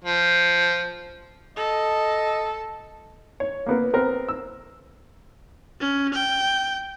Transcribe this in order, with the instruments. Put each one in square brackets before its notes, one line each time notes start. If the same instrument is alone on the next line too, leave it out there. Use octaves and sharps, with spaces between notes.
[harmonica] F3
[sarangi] A4 [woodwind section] D#5
[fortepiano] C#5
A#3 B3 A#4
B3 C4 A#4
E6
[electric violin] C#4
G5